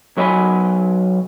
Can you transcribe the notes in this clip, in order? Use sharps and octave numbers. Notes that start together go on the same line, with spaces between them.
B1 F#3 A#4 C#5 G#5 B5